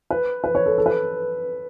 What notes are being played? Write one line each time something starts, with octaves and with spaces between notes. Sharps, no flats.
B4
B4
C#5
A4
A4
B4